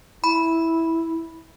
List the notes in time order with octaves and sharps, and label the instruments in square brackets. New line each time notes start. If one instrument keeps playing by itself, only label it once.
[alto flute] E4 [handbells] B5